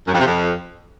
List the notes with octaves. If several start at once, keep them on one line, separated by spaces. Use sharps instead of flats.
F#2
F2
C3
F2